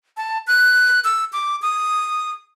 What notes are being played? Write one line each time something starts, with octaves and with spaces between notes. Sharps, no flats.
A5
F#6
E6
D6
D#6